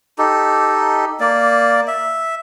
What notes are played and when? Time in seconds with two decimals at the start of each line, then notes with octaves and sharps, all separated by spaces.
0.18 D#4 G4 A4
1.20 A#3 D5
1.88 E5